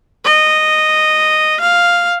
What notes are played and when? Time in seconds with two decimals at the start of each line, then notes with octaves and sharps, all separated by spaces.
0.25 D#5
1.61 F5